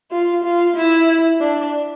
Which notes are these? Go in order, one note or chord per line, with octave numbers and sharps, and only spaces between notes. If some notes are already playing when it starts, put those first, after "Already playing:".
F4
F4
E4
D4